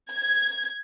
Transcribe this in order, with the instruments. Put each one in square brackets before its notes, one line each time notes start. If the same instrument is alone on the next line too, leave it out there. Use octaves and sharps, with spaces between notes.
[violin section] G#6